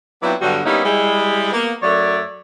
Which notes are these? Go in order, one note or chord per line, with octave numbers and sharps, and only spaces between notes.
F#3 B3 C4 D4 E4 F4
G2 D3 F#3 G3 B3 F#4
G3 A#3 B3 C#4 D#4 E4
G3 G#3 E4
A#3 B3
F#2 F#3 A3 C#5 D5